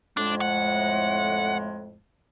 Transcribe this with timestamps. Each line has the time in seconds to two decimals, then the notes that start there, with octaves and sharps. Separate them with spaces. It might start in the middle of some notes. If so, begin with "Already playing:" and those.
0.17 F2 A2 G#3 D4
0.41 F#5